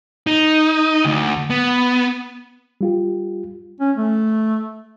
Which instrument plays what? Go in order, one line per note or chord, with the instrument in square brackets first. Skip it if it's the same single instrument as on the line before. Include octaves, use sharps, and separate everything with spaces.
[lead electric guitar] D#4
D2
B3
[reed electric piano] G3 F4 G4
[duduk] C#4
A3